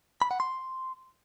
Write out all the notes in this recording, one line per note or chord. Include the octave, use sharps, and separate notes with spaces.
B5
F#5
C6